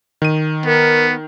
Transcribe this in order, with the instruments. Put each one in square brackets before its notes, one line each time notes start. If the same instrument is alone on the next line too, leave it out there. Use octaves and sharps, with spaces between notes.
[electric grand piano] D#3 D#7
[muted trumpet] B3 [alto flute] A#4